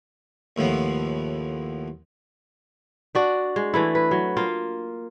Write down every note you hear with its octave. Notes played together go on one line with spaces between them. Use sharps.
D#2 A2 F3 B3
D4 F#4 D5
G#3
E3 A3 E4
B4
F#3
A#3 F4